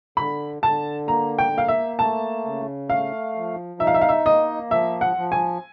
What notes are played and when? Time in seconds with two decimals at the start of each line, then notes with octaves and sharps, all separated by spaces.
0.17 D3 B5
0.62 D3 A5
1.07 A#3 A#5
1.39 G5
1.53 A#3 F5
1.68 E5
1.99 A3 A5
2.45 C#3
2.89 A3 F5
3.35 F3
3.80 D#4 E5
3.87 F5
3.94 E5
4.01 F5
4.09 E5
4.26 A#3 D#5
4.70 F3 E5
5.01 F#5
5.17 F3
5.32 G#5